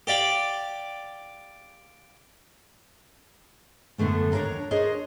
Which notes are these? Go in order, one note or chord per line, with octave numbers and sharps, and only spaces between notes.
G4 D5 F5 G5
F#2 A2 D3 A3 B3
D#2 D4 A#4 C#5 A#5
D4 G#4 A#4 C5 C#5 D#5